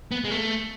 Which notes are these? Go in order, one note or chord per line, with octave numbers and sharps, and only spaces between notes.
B3
G#3
A3